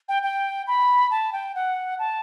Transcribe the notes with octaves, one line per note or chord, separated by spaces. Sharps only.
G5
G5
B5
A5
G5
F#5
A5